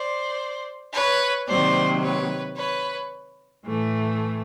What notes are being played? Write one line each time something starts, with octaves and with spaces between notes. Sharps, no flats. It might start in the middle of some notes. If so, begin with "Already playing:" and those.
Already playing: C5 D5
B4 C#5
C3 D#3 F#3 A#3 C5 D5
B4 C#5
B4 C#5
A2 E3 A3